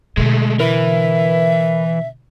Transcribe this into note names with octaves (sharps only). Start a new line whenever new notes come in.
B2 D3 G#3 A3
E3 A#4 B4 E5